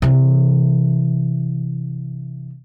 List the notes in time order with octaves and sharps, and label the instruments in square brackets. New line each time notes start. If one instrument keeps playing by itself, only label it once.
[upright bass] C3 E3